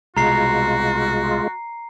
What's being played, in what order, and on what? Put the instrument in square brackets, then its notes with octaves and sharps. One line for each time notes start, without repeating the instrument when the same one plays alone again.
[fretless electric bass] C2 B2 [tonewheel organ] G#3 F4 [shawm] F#4 [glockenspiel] A#5 C7